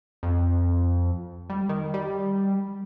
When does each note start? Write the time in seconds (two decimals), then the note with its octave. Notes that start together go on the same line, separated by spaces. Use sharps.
0.23 F2
1.50 G3
1.69 D#3
1.94 G3